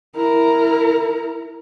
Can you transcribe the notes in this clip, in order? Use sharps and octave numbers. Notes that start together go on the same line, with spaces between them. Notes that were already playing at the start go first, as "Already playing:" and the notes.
E4 A#4